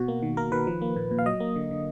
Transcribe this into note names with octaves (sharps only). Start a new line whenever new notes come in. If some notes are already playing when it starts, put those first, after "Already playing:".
Already playing: B2 F#4
A#3
D#3
A#3 A#4
D#3 B4
F3
A#3
A#2
A#2
F5
F#3 D#5
A#3
D3
D3